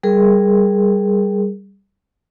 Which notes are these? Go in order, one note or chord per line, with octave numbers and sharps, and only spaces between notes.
G3 G#4 A#4